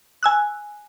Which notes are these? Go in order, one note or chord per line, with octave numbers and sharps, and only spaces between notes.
G#5 E6 F#6